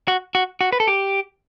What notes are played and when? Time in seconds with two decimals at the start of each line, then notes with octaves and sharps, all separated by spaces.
0.08 F#4
0.35 F#4
0.61 F#4
0.72 B4
0.80 A4
0.87 G4